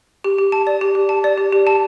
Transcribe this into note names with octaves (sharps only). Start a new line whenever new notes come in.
G4
G4
A5
D5
G4
G4
A5
D5
G4
G4
A5